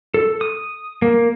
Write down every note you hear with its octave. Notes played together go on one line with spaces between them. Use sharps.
A4
D#6
A#3